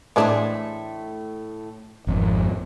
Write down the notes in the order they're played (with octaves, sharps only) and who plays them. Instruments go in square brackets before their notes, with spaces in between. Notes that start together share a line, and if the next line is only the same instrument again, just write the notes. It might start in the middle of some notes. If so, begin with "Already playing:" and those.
[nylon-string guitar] A2 A3 C5 [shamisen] E3 G#3 D4
[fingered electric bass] G#1 F2